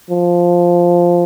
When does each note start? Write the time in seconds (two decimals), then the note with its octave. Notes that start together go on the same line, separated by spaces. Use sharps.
0.10 F3